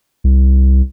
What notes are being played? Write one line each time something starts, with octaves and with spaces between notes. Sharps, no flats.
C2